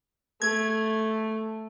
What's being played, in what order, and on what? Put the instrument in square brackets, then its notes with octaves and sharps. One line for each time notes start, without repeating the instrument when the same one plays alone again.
[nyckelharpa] A3 [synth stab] G#6